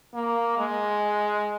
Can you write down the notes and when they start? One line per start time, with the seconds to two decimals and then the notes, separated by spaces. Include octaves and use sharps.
0.14 A#3
0.58 G#3